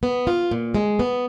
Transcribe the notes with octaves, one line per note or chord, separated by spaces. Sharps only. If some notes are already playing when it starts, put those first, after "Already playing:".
B3
F4
A#2
G#3
B3